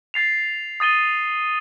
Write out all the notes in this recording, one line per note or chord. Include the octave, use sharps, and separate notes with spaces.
A6 C7 F7
D#6 A6 D#7 G7